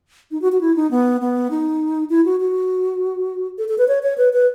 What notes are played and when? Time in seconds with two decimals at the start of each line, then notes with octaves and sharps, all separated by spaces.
0.31 D#4
0.42 F#4
0.52 F#4
0.61 E4
0.76 D#4
0.91 B3
1.21 B3
1.51 D#4
2.10 E4
2.25 F#4
2.40 F#4
3.58 A4
3.68 A4
3.78 B4
3.88 C#5
4.03 C#5
4.18 B4
4.33 B4